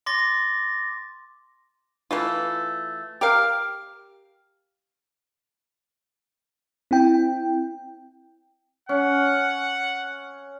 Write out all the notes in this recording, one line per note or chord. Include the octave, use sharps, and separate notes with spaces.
C6 D6 A6 A#6
E3 A3 F4
G4 A#4 F5
C4 E4 G5
C#4 F#5